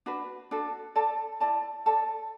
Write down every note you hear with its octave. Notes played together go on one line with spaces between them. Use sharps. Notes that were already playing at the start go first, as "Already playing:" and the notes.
D4 F#4 B4
D4 F#4 A4
A4 D5 A5
E4 D5 A5
A4 D5 A5